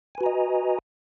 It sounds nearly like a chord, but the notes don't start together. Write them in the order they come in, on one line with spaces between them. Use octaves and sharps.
G#5 B4 F#4 A#5 D#5